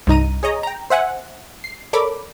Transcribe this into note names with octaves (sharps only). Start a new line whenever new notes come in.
C2 G2 D#4 A#5 D#7
G#4 C#5 D#5 A#5
G5 A#5
C5 E5 F#5 G#5
C7
A4 A#4 C#5 D5 B5 D6